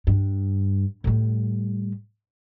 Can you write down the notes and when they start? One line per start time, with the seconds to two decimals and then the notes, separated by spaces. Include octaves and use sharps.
0.07 G2
1.04 A2 G3